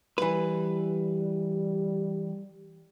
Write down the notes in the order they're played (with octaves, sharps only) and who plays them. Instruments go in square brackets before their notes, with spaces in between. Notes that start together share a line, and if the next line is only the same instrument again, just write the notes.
[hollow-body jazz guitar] E3 B4 [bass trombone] G3